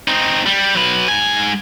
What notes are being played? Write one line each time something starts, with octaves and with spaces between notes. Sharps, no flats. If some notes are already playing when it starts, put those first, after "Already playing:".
C4 D#4
G3
F#3 B4
G#2 G#5